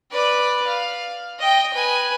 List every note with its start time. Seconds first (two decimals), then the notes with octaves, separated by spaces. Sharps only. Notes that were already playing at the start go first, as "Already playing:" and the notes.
0.11 B4 D5
0.67 F5
1.39 D#5 G5
1.74 B4 G#5